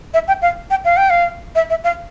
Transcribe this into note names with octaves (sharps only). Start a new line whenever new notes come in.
E5
G5
F5
G5
F5
G5
F5
E5
E5
F5